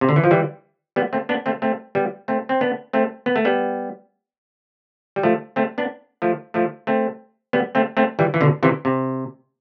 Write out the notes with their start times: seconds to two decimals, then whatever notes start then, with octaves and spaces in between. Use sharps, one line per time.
0.01 C3
0.09 D3
0.16 E3
0.24 F3
0.31 E3 G3
0.96 G3 B3
1.13 A3 C4
1.29 B3 D4
1.46 A3 C4
1.62 A3 C4
1.95 G3 B3
2.28 A3 C4
2.49 C4
2.61 B3 D4
2.93 A3 C4
3.26 B3
3.36 A3
3.45 G3 B3
5.16 G3
5.23 F3 A3
5.56 A3 C4
5.78 B3 D4
6.22 F3 A3
6.54 F3 A3
6.87 A3 C4
7.53 G3 B3
7.75 A3 C4
7.97 A3 C4
8.19 E3 G3
8.34 E3
8.41 B2 D3
8.63 C3 E3
8.85 C3